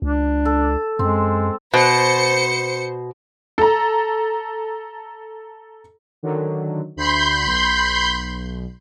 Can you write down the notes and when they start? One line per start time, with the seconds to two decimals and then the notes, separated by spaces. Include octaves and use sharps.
0.02 C#2 D4
0.45 A4
0.99 F#2 G#3 C4
1.74 B2 C5 C#7
3.58 A4 A#5
6.23 D3 D#3 F#3
6.96 D2 B5 C6 G6
7.46 B1